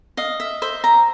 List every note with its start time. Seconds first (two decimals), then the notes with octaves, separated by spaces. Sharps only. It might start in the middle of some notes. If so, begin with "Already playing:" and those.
0.17 D#5 F5
0.40 E5
0.62 C5 E5
0.84 A#5